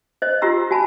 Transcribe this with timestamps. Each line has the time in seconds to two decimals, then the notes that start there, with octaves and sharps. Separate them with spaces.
0.22 C5 D#5
0.42 F4 G4 A#5 E6
0.71 F#4 G#5 A5 B5